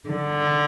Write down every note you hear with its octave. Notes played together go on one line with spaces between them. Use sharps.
D3